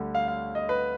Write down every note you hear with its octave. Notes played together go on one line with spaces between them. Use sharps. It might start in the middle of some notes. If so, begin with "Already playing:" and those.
Already playing: D2 D3 G3
F5
F5
D#5
B4